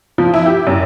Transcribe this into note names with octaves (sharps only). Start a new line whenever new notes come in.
F3
E4
G4
F#2